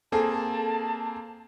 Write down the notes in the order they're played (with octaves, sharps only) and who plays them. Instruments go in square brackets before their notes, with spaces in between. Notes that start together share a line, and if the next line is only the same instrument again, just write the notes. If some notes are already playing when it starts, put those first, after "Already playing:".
[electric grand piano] A#3 C4 G#4 [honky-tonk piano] A4 [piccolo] A5